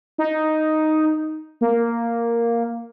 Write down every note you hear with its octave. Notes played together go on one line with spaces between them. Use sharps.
D#4
A#3